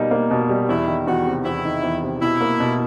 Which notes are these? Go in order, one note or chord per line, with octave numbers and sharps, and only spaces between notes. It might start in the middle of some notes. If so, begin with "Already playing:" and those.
Already playing: B2 G3 A#3 D#4
A#3
B2
G3
E2 E4
D#3
E2 F#4
C3
E2 E4
D#3
E2
C3
B2 E4
A#3
B2